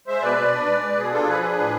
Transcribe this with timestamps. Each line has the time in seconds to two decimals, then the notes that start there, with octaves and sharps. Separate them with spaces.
0.07 G#3 C5 E5
0.22 B2 B4 D5
0.37 B2
0.53 D4
0.67 G#3
0.82 B2
0.97 B2 G#4
1.12 D4 F4 A4
1.27 F3 G#4 B4
1.42 D4
1.58 A2